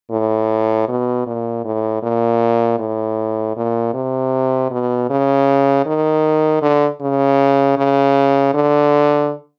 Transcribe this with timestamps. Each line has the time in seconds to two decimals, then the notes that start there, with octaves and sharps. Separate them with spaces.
0.11 A2
0.88 B2
1.26 A#2
1.65 A2
2.03 A#2
2.79 A2
3.57 A#2
3.94 C3
4.71 B2
5.10 C#3
5.86 D#3
6.62 D3
7.01 C#3
7.77 C#3
8.54 D3